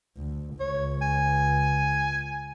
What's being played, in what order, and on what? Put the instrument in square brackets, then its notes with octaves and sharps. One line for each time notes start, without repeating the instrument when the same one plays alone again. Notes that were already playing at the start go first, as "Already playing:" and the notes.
[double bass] D2
[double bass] C#2 [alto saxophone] C#5
[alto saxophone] G#5